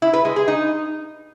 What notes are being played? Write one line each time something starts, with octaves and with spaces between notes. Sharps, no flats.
E4
B4
G#3
G#4
D#4